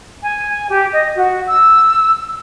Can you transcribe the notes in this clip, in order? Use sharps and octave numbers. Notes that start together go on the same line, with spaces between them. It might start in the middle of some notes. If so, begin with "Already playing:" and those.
G#5
G4
D#5
F#4
E6